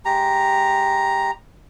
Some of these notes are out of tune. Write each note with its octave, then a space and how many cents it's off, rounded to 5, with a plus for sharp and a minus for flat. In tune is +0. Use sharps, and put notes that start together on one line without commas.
G#3 +0 G4 +0 A#5 +0